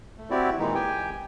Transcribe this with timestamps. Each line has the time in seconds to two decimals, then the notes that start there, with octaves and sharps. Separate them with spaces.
0.18 A3
0.30 C4 E4 F#4 G4 D5
0.59 A#2 D#3 E3 G#3 D#4
0.75 G4 G5 G#5